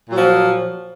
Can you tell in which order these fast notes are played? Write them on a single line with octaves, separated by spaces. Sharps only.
A#2 F#3 F3